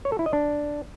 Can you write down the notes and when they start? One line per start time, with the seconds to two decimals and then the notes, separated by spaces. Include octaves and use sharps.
0.05 C#5
0.12 A4
0.19 E4
0.26 D#5
0.33 D4